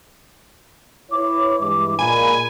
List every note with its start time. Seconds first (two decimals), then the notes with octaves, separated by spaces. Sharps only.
1.11 E4 B4 C#5 D6
1.59 G2 E3 G#3 D6
1.99 A#2 G#3 G#5 B5